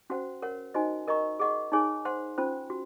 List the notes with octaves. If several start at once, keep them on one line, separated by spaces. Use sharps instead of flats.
C#4 F#4 C5 F#5
A#4 C#5 F#5
D#4 F#4 C5 D#5 G#5
A#4 D#5 A#5 C#6
G#4 D#5 F#5 C#6
D#4 G#4 C#5 G#5
C5 F#5 C6
C#4 F4 C5
F#4